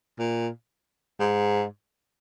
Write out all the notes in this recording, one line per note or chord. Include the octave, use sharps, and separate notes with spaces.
A#2
G#2